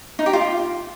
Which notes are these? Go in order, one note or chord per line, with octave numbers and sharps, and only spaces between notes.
D#4
G4
F4